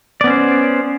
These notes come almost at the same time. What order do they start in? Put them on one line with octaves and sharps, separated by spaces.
D5 B3 C#4 C5